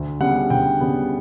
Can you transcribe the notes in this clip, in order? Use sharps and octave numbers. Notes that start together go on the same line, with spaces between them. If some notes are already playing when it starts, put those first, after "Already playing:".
Already playing: D2
C#3 G3 B3 F#5
D2 G5
C#3 G3 B3